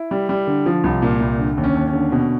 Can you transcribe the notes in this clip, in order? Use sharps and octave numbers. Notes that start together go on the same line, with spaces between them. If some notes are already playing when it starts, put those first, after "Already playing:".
Already playing: E4
G3
G3
D3
F3
C2
A#2
C2
D3
D#2
C#4
D#2
C#4
D3
B2